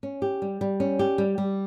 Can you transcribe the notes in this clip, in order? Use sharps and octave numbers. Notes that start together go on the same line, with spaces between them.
C#4
G4
G3
G3
C#4
G4
G3
G3